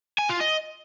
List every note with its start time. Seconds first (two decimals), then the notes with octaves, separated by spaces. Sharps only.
0.19 G#5
0.30 F4
0.41 D#5